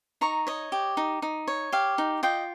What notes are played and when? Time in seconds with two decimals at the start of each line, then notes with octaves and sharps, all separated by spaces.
0.21 D#4 A#5 C#6
0.47 C#5 D#5
0.72 G4
0.97 D#4
1.22 D#4
1.48 C#5
1.73 G4 F5
1.98 D#4
2.23 F4 D#5 G5